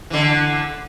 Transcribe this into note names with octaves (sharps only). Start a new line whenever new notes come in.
D3 E3